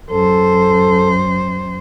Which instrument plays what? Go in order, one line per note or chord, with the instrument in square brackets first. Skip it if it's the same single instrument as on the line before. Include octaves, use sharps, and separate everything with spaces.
[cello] F#2 C5 [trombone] A4